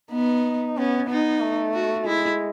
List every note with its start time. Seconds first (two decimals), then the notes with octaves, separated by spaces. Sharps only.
0.12 B3 D#4
0.77 B3 C#4
1.09 B3 D#4
1.41 A3
1.74 F#4
2.06 G#3 E4